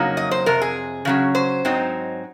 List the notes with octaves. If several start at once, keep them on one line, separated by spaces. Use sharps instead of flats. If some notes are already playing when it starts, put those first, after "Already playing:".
Already playing: F2 C#3 F#3 A#3 D#4
D#5
C5
F2 C3 A#4
G#4
C#3 F#3 C#4
C5
G#2 F#3 C4 D#4